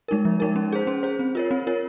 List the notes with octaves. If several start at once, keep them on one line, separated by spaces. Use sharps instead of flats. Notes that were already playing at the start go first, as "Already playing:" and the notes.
G#3 D#4 A#4
F3
G#3 D#4 A#4
C#4
G#4 C5
C#4
G#4 C5
C4
F4 A#4 C#5
C4
F4 A#4 C#5